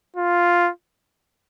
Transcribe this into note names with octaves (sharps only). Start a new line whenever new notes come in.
F4